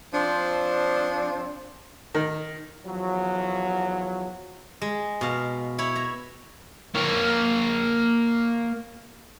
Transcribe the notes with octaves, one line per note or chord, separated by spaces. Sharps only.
F3 C4 D4
D#3
E2 F3 F#3
G#3
B2 F5
E4 C#5 B5
E5 A#5
A#3 C#5